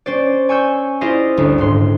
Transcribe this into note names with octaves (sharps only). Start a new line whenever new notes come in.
C#4 C5 D5
G#5 C#6 E6 G6
E4 F4 G#4 C5 D5 D#5
G1 D2
D#1 G#2 C6